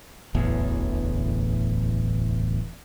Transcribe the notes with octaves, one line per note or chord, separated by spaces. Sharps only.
D1 A1 E2